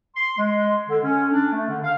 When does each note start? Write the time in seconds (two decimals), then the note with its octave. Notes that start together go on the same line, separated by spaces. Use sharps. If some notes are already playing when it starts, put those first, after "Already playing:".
0.16 C6
0.38 G#3
0.89 D3
1.03 C#4
1.32 D4
1.51 A3
1.69 D3
1.82 F5